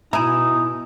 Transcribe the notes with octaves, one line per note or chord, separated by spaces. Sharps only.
B2 D#4 E4 G#5 A#5